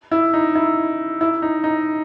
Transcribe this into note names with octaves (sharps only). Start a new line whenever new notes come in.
E4
D#4
E4
E4
D#4
D#4